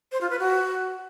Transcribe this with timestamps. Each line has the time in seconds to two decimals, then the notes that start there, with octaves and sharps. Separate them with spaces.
0.12 C5
0.21 F4
0.30 B4
0.39 F#4